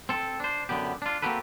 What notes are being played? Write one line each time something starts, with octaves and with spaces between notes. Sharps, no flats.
C4 A4
D4 C5
F#2 D3 B3 G4
D4 F4
A#3 C4 F#4 G4 A4 B4